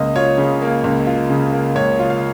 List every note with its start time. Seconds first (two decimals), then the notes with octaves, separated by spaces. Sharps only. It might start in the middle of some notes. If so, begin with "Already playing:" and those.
Already playing: C#2 A#3 D#5
0.16 F4 C#5
0.38 C#3
0.62 A#3
0.84 C#2
1.07 F4
1.30 C#3
1.53 A#3
1.76 C#2 C#5
1.99 F4
2.10 F5